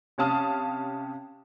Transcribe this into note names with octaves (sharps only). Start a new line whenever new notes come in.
C3 C#4 F5 A5 D#6 F6